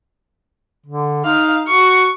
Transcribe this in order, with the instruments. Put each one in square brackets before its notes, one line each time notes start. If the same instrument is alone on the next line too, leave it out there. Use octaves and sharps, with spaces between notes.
[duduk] D3
[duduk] D#4 [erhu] F5
[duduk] F#4 [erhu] C#6